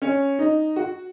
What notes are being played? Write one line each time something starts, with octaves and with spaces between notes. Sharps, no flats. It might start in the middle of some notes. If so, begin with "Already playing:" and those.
C#4
D#4
F#4